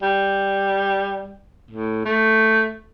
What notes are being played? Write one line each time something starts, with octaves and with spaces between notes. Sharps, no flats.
G3
A2
A3